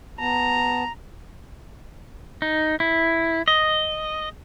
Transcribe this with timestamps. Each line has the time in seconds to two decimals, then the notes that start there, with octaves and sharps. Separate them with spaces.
0.19 B3 A5 A#5
2.42 D#4
2.80 E4
3.48 D#5